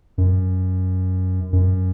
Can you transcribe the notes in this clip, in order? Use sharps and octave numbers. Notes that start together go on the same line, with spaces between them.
F#2
F#2